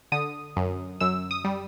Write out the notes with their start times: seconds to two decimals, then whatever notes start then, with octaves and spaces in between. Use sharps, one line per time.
0.12 D3 D#6
0.57 F#2
1.00 F#2 E6
1.31 D#6
1.44 G3